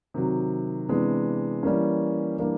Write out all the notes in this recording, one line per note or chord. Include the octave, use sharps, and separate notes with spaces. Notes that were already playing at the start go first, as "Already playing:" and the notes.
C3 D#3 F#3
C3 E3 G#3 B3 D4
E3 G3 A#3 C#4
E3 G3 A#3 D4